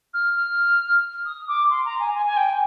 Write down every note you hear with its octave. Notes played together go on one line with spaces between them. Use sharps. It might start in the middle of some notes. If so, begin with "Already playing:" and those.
F6
F6
D#6
D6
C6
A#5
G#5
G#5
G#5
G5